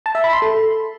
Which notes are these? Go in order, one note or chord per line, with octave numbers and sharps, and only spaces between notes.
A5
E5
B5
C6
A4